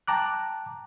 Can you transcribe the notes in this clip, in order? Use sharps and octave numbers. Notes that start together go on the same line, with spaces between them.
G5 A5 A#5 D6 F#6